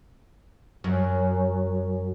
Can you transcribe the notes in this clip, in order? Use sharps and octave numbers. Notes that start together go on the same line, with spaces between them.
F#2